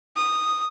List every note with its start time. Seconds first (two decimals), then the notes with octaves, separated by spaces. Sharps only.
0.16 D#6